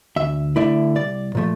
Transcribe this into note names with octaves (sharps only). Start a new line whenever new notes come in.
D2 E5
D3 A3 E4 D5
C2 D5
A#2 F3 A3